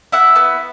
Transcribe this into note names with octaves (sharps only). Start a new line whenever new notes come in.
E4 E5 F#5
B3